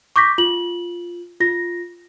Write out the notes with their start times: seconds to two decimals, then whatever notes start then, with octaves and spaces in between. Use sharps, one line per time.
0.16 C#6 D6 G6 A#6 B6
0.38 F4 F#7
1.40 F4 A#6